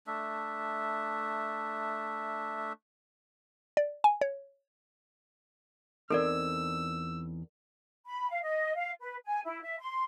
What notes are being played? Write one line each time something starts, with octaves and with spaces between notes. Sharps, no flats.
A3 D4 E5
D5
G#5
C#5
E2 C4 D#4 A4 A#4 D5 E6
B5
F5
D#5
F5
B4
G#5
E4
E5
C6